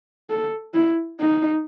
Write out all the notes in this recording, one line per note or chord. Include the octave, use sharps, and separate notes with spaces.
A4
E4
D#4